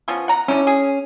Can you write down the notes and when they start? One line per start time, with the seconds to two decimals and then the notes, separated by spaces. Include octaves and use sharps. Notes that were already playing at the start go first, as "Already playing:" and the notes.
0.08 F3 B3 C#4
0.28 F#5 A#5
0.48 D3 C#4 D#4 E4
0.67 G#4